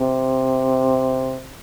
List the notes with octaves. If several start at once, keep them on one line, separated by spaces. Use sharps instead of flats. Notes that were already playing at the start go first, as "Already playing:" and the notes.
Already playing: C3